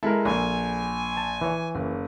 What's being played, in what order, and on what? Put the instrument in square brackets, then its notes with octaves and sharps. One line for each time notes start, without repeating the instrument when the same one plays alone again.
[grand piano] G#3 E4 [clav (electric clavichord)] A4 A#4
[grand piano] A#1 [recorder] G#5
[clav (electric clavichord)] A5
E3 C#5
[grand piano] F#1